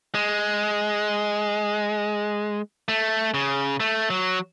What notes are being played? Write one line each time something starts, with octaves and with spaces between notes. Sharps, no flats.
G#3
A3
C#3
A3
F#3